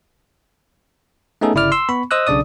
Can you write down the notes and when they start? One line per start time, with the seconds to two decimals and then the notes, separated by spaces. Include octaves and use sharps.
1.41 A3 B3 C#4 D#4 G#4 A4
1.55 G1 C#3 E4 D5 D6 F6
1.72 C6 E6
1.89 B3 B5 C#6
2.11 C5 D#5 D#6 E6 F#6
2.27 B1 C#3 D4 D5 D#6